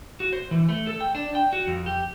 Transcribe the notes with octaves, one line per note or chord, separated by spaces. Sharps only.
F#4
C5
E3
A3
A4
G5
D4
G5
F#4
F2
G4